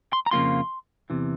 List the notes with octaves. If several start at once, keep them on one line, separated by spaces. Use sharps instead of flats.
C6
A#5
F2 C#3 F3 A#3 F4 C6
E2 C3 E3